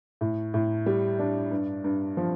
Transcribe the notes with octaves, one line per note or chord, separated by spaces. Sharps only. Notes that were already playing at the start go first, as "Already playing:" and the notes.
A2
A2
G3
D4
G2
G2
F3